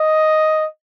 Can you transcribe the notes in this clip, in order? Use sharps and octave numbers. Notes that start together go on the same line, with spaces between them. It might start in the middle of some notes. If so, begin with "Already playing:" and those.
Already playing: D#5